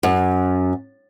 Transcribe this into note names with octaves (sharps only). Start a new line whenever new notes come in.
F#2